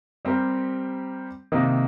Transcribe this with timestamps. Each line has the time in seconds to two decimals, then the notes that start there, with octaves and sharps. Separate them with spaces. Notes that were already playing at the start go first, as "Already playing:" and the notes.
0.25 G3 C4 G4 A#4
1.52 C3 D#3 A#3 D#4